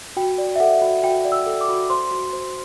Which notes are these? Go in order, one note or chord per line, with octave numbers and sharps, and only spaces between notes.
F#4 G5
D5
E5
A4 F#5
F#4
F#4 G5
D5
E6
A4
D6
F#4
C5 C6
F#4
C5